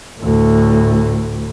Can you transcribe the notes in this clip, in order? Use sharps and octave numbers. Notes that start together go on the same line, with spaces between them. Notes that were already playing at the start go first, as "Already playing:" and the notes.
D2 A2